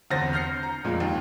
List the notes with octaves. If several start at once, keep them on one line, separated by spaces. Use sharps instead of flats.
G1 E2 C4 A6 A#6
F6 G6 A#6 C7 C#7
A#5
F2 A#2 G#3 F4
D#2